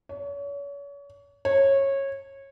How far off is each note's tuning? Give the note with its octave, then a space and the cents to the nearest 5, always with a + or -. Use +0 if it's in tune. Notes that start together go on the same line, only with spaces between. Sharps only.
C#5 +35
C#5 -20